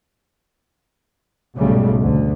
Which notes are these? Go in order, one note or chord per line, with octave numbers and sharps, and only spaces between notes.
B1 G#2 C#3 G3 A3
D2